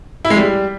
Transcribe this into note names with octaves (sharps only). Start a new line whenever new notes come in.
E4
G#3
G3